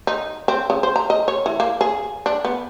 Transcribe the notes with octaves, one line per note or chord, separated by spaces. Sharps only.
D#4
C4
C#3
C5
A#5
D#5
C#5
E3
A#3
G#4
D4
B3